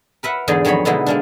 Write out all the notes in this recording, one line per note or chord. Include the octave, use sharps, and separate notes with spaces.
A#4 B4 E5 F#5
E2 G#2 D3 D#4 G#4 D5
F2 D#3 F#3 G#4 C#5 B5
B2 D3 G#3 B3 D#4 E4
G#3 A#3 D4